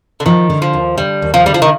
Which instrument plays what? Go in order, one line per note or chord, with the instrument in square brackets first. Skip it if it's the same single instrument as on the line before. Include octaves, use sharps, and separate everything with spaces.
[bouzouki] D3
[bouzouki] D#3 [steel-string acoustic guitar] F3
[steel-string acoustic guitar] D3
[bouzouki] F3
[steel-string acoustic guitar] D#2
[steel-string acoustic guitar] D3 [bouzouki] G3
[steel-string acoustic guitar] D#2
[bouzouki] F3
[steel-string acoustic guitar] D3 [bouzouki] G3
[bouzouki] F3
D#3